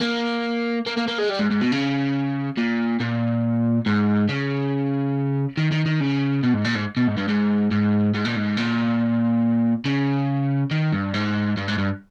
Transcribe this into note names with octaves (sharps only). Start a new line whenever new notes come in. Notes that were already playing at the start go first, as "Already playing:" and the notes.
A#3
A#3
A#3
A#3
G#3
G3
G#2
G#2
B2
C#3
A#2
A#2
G#2
C#3
D#3
D#3
D#3
C#3
B2
G#2
A#2
G#2
B2
G#2
G2
G#2
G#2
G#2
A#2
G#2
A#2
C#3
D#3
G2
G#2
G2
G#2
G2